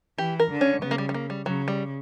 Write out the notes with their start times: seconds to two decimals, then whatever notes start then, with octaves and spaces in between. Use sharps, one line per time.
0.18 E3 G4
0.40 A#4
0.51 D3
0.61 C#4
0.82 C#3 B3
0.91 A#3
0.98 G3
1.09 G3
1.14 A#3
1.30 G3
1.46 C#3 F#3
1.68 G3